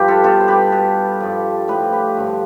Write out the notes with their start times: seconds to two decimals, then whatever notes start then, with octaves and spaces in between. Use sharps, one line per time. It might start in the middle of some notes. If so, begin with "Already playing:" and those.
Already playing: G2 F3 G4 B4
0.08 F4 A4
0.24 B2 F4 A4
0.40 C5
0.48 G4 B4
0.72 B2
1.21 G2 F3
1.68 A2 F3 G4 B4
1.92 G4 B4
2.17 G2 D3 F3